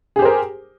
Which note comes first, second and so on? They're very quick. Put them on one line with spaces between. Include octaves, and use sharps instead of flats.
G#4 G4 C5 A#4